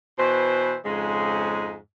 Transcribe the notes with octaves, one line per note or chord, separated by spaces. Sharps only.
B2 E3 C5
F2 G#2 C#3 G#3